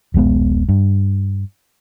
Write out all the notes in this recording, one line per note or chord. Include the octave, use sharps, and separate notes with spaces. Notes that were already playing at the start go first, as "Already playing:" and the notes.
D#1 A#1 G#3 B3
G2